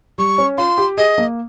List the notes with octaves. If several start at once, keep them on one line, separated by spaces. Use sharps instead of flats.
G3 C#6
C#4
F4 C6
G4
G#4 D#5
A#3